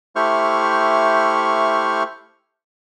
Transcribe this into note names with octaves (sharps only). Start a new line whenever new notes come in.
A3 E4 G4 C5 C#6 F6